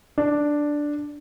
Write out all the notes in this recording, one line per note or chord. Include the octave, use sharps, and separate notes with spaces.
D4